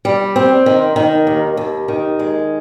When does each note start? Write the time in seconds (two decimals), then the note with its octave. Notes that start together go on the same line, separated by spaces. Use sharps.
0.05 G3
0.36 C4
0.66 D#3
0.96 D#3
1.27 D#2
1.57 D#2
1.88 D#3
2.19 G#3